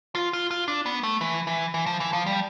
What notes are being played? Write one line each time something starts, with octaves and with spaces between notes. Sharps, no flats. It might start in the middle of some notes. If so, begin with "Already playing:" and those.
F4
F4
F4
D4
B3
A3
E3
E3
E3
F3
E3
F3
G3